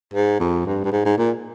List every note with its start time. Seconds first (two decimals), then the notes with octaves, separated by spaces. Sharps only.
0.14 G#2
0.40 F2
0.66 G2
0.84 G2
0.92 G#2
1.05 G#2
1.18 A#2